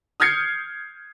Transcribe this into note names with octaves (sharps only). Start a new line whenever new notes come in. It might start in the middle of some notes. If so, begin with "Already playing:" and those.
D#6 F6 G6 G#6 C7 C#7